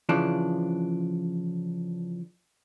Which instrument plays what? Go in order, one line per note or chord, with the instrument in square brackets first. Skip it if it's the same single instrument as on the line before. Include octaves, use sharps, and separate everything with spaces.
[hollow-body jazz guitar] C#3 E3 F3 D4